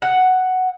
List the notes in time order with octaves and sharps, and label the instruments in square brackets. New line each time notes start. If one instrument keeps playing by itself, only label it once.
[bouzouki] F#5